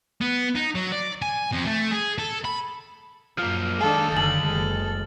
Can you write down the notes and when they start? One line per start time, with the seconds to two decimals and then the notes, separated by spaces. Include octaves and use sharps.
0.21 B3
0.56 D#4
0.75 F#3
0.92 D5
1.22 G#5
1.52 F2
1.66 A3
1.91 G#4
2.18 A4
2.45 B5
3.38 F#2 F3 A#3 F6
3.81 D#3 G#3 D4 A4 F5
4.12 F#1 D3 A6 F#7
4.44 F#1 G#3 A4